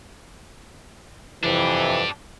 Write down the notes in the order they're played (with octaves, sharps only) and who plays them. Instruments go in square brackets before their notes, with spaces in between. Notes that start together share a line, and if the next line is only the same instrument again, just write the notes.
[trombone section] F2 C3 E3 [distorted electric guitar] D4 G4